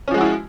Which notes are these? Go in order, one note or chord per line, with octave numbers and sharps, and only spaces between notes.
F3 G#3 C#4 E4 F#4